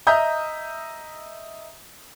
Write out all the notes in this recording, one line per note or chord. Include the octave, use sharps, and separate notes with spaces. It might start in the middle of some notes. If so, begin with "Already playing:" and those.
D#5 E5 A#5 D#6 G6